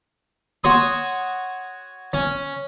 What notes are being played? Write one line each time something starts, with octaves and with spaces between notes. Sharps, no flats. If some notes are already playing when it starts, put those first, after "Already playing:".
F#4 C#5 C6 D#6
C#4